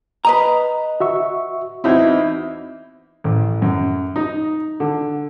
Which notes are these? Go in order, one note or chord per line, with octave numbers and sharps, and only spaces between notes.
B4 D#5 A#5
F#4 E5 C#6
E2 C4 D#4 E4 F#4 G#6
A1
F#2
D#4
D3